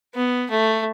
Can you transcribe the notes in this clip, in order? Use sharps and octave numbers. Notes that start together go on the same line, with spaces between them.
B3
A3